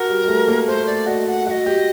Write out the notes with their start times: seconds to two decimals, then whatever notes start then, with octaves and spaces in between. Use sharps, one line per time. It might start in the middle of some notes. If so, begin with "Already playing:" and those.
Already playing: F#4 A#4
0.08 G3
0.23 G3
0.27 A3
0.48 A#3
0.67 A3 C5
0.87 D5
1.06 F#4 D#5
1.27 F#5
1.46 F#4 F#5
1.50 D#5
1.66 G4